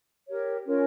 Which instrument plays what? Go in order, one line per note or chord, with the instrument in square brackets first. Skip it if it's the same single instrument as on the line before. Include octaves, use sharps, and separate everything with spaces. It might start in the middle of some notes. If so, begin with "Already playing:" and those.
[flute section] G4 A#4 C#5
C#4 F4 A#4 C#5